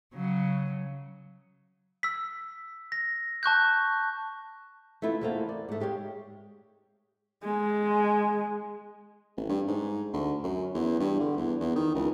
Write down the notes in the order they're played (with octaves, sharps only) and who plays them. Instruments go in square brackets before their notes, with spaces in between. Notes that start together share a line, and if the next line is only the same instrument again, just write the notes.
[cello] C#3 F#3
[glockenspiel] E6 B6
A#6
A5 C#6 F#6 G6
[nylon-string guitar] A3 B3 E4 F4
E2 A3 A#3 C5 F5
D5
G#2 A3
G#3 G4 C#5 F5
[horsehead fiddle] G#3
[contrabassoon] A1
G2
G#2
D2
F#2
E2
G2
D3
E2
E2
D#3
C#2